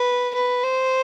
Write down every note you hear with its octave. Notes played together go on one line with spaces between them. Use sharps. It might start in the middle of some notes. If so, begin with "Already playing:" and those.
Already playing: B4
B4
C5